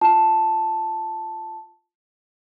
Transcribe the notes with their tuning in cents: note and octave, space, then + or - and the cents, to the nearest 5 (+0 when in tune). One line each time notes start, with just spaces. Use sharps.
F4 +0 A5 +0